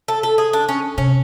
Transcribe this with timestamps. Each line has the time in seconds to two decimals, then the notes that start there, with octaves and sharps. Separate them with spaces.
0.08 A4
0.23 A4
0.38 G#4
0.53 D4
0.69 C#4
0.97 C3 C#4